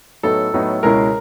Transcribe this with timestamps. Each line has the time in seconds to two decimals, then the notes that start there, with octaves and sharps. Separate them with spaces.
0.23 A2 F#3 B3 D#4 A4
0.54 A2 F#3 B3 D#4
0.83 C#2 B2 G#3 C#4 E4 A#4